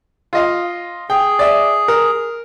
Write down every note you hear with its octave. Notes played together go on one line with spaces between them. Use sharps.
F4 D#5 F5
G#4 G5
D5 E5
A#4